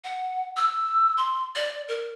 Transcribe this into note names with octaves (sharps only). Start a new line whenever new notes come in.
F#5
E6
C6
D5
A#4